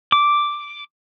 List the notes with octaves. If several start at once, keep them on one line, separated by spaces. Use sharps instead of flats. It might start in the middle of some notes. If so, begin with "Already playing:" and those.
D6